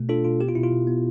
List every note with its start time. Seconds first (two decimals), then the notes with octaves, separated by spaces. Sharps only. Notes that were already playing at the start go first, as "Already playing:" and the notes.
Already playing: B2 A3
0.09 D4 F4 A4
0.24 B2 F4
0.41 B3 G4
0.48 F4
0.55 B2 E4
0.64 F4
0.73 B2
0.87 B3